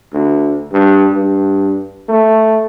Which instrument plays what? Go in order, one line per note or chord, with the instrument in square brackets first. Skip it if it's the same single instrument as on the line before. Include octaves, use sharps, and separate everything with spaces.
[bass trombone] D2
G2
G2
A3